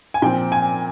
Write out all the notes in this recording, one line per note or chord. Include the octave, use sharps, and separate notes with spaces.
G#5
A#2 F3 C4 G5
G#5